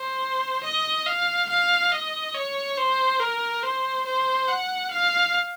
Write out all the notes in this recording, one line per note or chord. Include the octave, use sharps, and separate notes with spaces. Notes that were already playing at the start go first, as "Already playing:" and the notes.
Already playing: C5
D#5
F5
F5
D#5
C#5
C5
A#4
C5
C5
F#5
F5